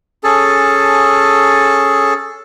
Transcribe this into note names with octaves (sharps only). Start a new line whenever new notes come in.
C#4 G#4 A4 A5